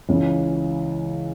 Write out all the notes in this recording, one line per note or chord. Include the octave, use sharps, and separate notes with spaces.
C#2 C#3 E3